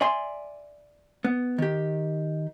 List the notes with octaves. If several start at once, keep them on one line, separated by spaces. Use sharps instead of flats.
D5 E5 G#5 C6
B3
D#3 G4